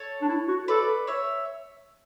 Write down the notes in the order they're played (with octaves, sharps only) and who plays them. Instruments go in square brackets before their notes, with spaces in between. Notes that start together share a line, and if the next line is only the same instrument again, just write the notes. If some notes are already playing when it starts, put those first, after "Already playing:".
Already playing: [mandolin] A4 C#5
[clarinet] D4
E4
F#4
[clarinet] A4 [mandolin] B4 D5
[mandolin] C#5 E5